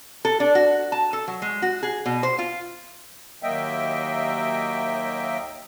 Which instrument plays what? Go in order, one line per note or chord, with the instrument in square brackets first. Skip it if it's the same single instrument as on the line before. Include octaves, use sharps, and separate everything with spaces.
[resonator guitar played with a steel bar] A4
D4
F#4
A5
A4
F#3
G#3
F#4
G#4
B2
C5
F4
[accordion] D#2 F#3 A#3 D#5 E5 G5